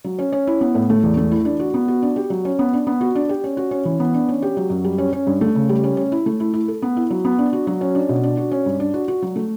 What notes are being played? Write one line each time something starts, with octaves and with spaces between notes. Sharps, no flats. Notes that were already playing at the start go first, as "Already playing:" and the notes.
F#3
C#4
C#4
E4
B3
A2
A3
E2
A3
E4
D4
F#4
B3
F#4
D4
G4
F#3
C#4
B3
D4
B3
F#4
D4
G4
C#4
F#4
C#4
E3
B3
D4
C#4
G4
F#3
F#2
G3
C#4
C#4
G2
A3
C#3
G3
C#4
C#4
E4
A3
E4
E4
A4
B3
E4
F#3
B3
D4
F#4
F#3
C#4
D4
B2
D4
F#4
C#4
G2
D4
F#4
F#4
F#3
A3